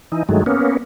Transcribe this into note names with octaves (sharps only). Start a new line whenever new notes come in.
E3 D#4
G2 D#3 F#3 G#3 A3
A#3 B3 C#4